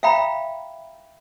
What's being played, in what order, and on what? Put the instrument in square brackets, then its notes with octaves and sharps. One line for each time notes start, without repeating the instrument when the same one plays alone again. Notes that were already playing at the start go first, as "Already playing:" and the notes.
[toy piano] E5 F5 G5 A#5 B5